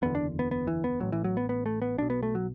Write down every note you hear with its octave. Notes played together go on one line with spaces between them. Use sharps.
F#1 E2 D3 B3
D4
B3
B3
E3
B3
A1 A2 F#3
E3
F#3
B3
B3
A3
B3
B1 B2 D4
B3
A3
F#3